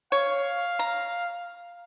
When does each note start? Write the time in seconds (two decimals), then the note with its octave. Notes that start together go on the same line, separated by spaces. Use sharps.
0.12 C#5 F5
0.79 A#5